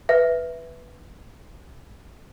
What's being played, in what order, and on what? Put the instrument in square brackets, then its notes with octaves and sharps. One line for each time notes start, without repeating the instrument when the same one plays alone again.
[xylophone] B4 E5